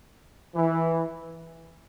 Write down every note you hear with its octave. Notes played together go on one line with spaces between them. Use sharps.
E3